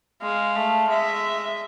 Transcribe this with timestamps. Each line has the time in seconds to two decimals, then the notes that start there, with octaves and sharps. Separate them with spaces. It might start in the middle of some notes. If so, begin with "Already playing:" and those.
0.22 G#3 F5
0.56 A3
0.89 G#3 E5